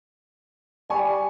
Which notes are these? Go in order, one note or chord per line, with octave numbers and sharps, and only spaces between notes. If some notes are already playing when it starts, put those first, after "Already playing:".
G3 G#5 C#6